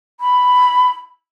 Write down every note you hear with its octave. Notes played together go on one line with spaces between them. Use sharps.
B5